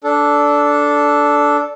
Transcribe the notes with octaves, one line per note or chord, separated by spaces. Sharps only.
D4 A4